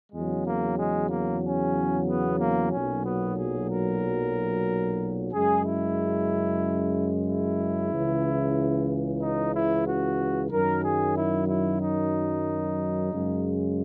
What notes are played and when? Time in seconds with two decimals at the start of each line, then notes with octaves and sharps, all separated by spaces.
0.13 E2 C#3 F#3 G#3
0.45 A#3
0.78 G#3
1.10 A#3
1.42 C#4
2.07 B3
2.39 A#3
2.72 B1 A#2 F#3 C#4
3.05 B3
3.37 G#4
3.69 A#4
5.31 F#2 C#3 G#3 G#4
5.64 E4
7.26 E4
7.91 C#2 C#3 E3
9.20 D#4
9.53 E4
9.86 F#4
10.50 F#2 D#3 F#3 A#4
10.83 G#4
11.15 E4
11.48 E4
11.81 D#4
13.10 F#2 C#3 G#3